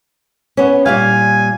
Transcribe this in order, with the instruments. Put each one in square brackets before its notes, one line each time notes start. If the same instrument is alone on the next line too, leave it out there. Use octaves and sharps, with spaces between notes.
[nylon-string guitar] B3 C#4
[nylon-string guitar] A#2 G3 F5 [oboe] G#5